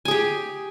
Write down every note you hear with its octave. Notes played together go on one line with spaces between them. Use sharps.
G4 G#4 G#5